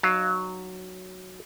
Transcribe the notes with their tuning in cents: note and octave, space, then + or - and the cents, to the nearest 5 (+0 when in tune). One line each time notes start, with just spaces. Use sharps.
F#3 +0 D#4 -30 F5 +0